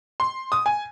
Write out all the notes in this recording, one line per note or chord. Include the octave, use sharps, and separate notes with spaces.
C6
D#6
G#5